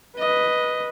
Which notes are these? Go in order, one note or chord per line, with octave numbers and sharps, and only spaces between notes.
B4 D#5